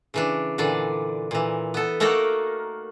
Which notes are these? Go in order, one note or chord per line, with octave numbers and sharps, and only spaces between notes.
C#3 E3 D4
A#2 D3 E3 D4 D5
A#2 E3
B3 A4
A3 A#3 D#4 F#4 A4 A#4